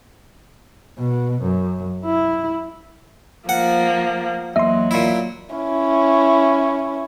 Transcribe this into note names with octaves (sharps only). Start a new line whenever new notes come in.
B2
F#2
E4
F3 A#3 F#5
E2 F#3 A#3 D#5 E5 C6
A#2 E4
C#4 E4